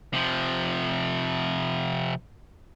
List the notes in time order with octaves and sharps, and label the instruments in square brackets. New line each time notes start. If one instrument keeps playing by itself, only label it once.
[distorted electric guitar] C3 F3